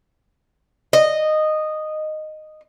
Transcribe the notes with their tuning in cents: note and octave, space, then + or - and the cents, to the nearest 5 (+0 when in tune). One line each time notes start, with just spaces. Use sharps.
D#5 -10